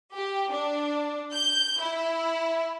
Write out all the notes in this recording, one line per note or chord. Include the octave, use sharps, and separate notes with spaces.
G4
D4
G6
E4